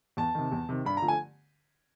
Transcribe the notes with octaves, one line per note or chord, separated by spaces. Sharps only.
E2 A5
C3 D#3
E2
C3 D#3
G2 B5
A#5
D3 F3 A3
G#5